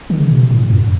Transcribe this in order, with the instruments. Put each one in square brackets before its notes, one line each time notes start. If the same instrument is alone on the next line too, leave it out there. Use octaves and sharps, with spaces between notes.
[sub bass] D#3
C#3
B2
A2
F#2